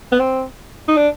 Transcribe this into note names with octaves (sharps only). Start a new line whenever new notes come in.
B3
C4
D#4
D4